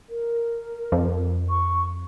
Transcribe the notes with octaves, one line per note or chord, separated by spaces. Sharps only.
A#4
F2
C#6